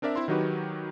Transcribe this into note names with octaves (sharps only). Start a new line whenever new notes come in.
C4 D4 A#4 D5 E5
C4 E4 E5 C6
D#3 F#3 D#4 F#4 G4 B4